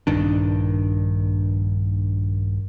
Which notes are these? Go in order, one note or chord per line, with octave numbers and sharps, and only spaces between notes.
A#1 G2 D#3 D4